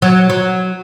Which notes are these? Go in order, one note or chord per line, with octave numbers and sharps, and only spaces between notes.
F#3
F#3